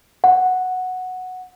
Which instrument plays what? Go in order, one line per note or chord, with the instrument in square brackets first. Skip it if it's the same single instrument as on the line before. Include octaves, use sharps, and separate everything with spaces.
[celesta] F#5